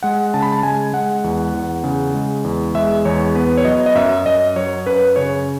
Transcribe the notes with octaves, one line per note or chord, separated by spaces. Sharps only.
G#3 F#5
C#3 A5
B5
A5
G#3 G#5
G#3 F#5
E2
E2
C#3
G#3
E2
G#3 E5
E2 C#5
B3 B4
C#5
F#3 D#5
D#5
F#2 E5
F#2 D#5
F#3 C#5
F#2 B4
C#3 C#5